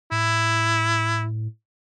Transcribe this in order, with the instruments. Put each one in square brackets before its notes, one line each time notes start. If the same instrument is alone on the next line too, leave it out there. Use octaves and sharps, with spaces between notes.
[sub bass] A2 [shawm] E4